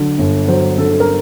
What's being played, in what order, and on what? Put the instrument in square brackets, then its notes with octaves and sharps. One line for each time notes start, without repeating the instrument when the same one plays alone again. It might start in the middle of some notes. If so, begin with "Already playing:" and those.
Already playing: [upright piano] D3 F#3
G1
F#3 C5
D3 A4
A4
A#4